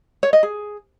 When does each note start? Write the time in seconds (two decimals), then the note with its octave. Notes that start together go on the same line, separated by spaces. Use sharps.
0.23 C#5
0.33 D#5
0.43 G#4